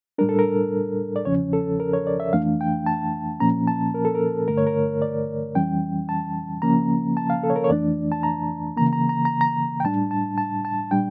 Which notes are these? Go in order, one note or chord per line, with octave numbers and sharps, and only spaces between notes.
A2 G3 D4 A#4
A4
A#4
D5
E2 C#3 F3 C#4 C#5
A4
A#4
C#5
D5
E5
F2 E3 A3 D4 F5
G5
A5
A#2 F3 A#3 C#4 A#5
A5
A#4
A4
A#4
G2 D3 A3 A#4
C#5
A#4
D5
F2 E3 G3 C#4 G5
A5
C#3 F3 A#3 C#4 A#5
A5
F5
A4
C#5
A#4
C#5
F2 E3 A3 D4 D5
A5
A#5
C#3 E3 A#3 A#5
A#5
A#5
A#5
A#5
G5
A2 G3 D4 A5
A5
A5
A5
A#2 G3 D4 G5